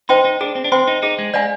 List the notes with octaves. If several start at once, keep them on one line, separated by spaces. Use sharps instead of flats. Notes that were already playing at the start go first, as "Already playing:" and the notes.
D#4 C5 G5 C6
D#4
D4 G#4
C4
D4
C4 C5 G5 C6
D#4
D#4 G#4
G#3
G#3 D5 F5 G#5